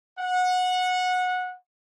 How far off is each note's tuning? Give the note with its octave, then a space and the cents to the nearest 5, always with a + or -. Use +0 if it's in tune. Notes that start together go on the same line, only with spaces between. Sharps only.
F#5 -20